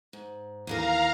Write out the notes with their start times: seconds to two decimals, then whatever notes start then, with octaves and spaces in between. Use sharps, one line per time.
0.13 G#2
0.67 D#2 E3 A#4 F5 A#5